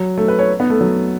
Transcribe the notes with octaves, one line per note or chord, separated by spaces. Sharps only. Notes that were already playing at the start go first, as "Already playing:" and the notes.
Already playing: F#3
A3
B4
C#5
B3
A3
F#3